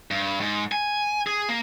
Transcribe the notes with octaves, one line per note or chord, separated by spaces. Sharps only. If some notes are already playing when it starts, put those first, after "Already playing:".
G2
G#2
G#5
G#4
A#3